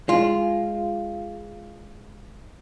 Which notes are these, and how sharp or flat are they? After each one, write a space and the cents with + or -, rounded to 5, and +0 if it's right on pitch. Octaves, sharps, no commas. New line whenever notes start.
G#3 +0 F4 -10